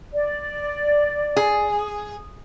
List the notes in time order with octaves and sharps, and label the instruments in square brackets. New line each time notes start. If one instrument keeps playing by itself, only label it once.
[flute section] D5
[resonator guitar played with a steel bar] G#4